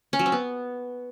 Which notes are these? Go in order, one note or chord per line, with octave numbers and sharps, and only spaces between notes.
C#4
F#3
C4
B3